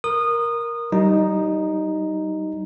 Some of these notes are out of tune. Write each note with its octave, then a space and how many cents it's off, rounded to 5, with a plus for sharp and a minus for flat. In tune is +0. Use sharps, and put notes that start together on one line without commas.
A#4 +5 D#6 -20
G3 -35 D#4 +0